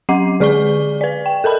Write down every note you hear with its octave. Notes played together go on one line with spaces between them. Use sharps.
F#3 C#4 F#5 D6 C7
D3 G#4 D5 C#6 G7
B4 D5
G5
A4 A#4 A5 B5